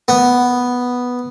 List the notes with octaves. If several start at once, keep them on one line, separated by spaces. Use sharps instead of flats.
B3